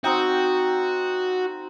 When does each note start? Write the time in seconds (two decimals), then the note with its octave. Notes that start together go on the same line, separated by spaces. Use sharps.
0.04 C4 D#4 F#4 G5